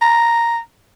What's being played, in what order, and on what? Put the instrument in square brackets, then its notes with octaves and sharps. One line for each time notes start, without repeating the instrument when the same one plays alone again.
[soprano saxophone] A#5